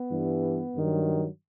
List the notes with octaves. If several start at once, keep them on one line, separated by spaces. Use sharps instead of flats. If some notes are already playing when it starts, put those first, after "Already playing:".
Already playing: B3
G2 E3 G3
G2 D#3 F#3